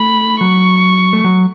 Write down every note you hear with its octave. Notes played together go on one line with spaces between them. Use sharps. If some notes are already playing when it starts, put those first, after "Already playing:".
Already playing: A3 B5
F#3 C#6
A3
F#3